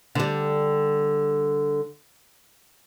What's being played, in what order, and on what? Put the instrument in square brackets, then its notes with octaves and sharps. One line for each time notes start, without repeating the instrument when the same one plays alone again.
[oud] D3 G3